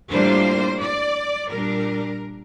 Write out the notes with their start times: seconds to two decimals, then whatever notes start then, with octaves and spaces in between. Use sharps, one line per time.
0.10 A2 G3 A#3 D4 F4 C5
0.81 D5
1.51 A#2 G3 D4 A#4